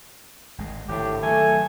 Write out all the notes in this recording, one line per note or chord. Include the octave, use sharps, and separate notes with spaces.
G#1 G#3
G#1 A2 D3 G4
D#3 F#3 A3 G#5